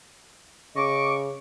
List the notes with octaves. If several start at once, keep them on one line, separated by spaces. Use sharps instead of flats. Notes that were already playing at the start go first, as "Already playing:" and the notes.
C#3 D#5 C#6 D6